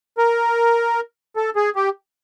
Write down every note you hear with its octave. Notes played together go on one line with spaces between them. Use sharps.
A#4
A4
G#4
G4